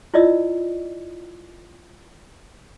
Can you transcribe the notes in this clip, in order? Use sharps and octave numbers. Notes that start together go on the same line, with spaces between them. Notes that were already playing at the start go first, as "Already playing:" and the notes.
E4 F4 D5 D#5 E6